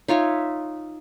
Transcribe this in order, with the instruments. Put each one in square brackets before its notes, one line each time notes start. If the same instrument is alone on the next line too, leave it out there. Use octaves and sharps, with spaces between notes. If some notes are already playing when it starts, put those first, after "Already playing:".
[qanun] D#4 F4 C#5 E5